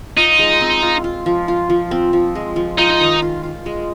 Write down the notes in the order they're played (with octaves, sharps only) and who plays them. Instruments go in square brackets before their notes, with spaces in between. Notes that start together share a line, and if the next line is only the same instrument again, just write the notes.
[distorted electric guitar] D#4 [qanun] F4
[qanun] G#3
C4
F4
F4
F3
F4
F3
C4
F3
G#3
F3
[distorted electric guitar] D#4 [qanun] F4
[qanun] D#3
F4
F4
G#3